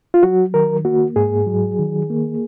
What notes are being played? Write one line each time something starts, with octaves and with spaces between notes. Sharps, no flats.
F4
F#3 F#4
D#3 A#4
A#3 F#4
G#2 G#4
F#3
D#3
A#3